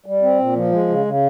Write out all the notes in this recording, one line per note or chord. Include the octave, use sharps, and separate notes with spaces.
G3
C4
A#2
F3
G#3
C#3
C#3